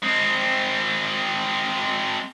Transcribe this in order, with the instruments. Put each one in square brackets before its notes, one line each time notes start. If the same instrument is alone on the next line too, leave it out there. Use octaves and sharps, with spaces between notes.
[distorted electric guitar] G#3 C4